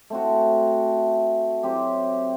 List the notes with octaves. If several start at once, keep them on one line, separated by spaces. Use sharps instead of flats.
A3 C4 F#4
F#3 C4 G4